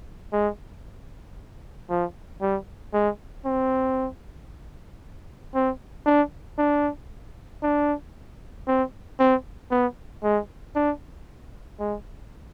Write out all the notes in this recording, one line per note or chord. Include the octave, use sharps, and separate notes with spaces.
G#3
F3
G3
G#3
C4
C4
D4
D4
D4
C4
C4
B3
G#3
D4
G#3